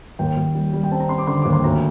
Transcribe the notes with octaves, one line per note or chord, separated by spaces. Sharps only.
D#2 G5
D#2
G3
G3
G5
C4 A5
A#5
C4 C6
D6
D3 C6
D#2 D6
C6
D2 A#5